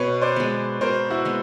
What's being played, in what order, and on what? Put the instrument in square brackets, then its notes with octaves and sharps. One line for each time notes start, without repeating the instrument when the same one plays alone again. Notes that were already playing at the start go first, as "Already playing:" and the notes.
Already playing: [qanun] B2 [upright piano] B4 C#5
[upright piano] C5 D5
[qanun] G#3 B3
[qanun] B2 [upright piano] A#4 C5
[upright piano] E4 F#4
[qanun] G#3 B3